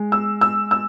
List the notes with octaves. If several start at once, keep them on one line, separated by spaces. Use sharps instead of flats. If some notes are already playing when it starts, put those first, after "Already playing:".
Already playing: G#3
E6
E6
E6